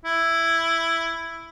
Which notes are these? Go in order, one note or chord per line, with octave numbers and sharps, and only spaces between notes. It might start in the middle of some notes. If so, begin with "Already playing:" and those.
E4